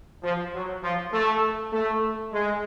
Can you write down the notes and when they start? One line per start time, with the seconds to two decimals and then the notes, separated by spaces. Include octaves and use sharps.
0.23 F3
0.53 F#3
0.82 F3
1.12 A3
1.72 A3
2.33 G#3